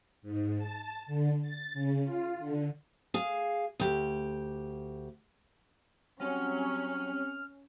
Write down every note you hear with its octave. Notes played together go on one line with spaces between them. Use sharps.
G#2
A5
D3
A6
C#3
F4
D3
G#4 F5
D2 G4
F#3 G3 C4 C#4 G4 F6